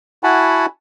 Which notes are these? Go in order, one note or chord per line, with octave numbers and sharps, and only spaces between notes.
E4 F#4 F#5 G#5 A5 B5